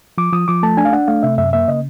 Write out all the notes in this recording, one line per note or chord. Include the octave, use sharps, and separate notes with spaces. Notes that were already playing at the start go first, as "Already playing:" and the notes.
F3 D6
F3 D#6
F3 D6
A3 A5
D4 G#5
F5
D4 F#5
A3 F5
C3 E5
F#2 E5
A#3 E5
C#3 D#5